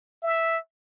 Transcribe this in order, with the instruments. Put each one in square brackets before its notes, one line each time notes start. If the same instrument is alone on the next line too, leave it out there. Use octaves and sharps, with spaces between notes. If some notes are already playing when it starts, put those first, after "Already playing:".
[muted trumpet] E5